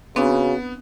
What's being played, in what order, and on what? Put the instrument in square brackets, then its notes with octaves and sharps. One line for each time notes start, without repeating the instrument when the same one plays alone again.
[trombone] C#3 [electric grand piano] B3 [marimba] C4 D4 [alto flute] F#4